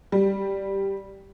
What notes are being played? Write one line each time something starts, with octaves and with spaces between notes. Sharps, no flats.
G3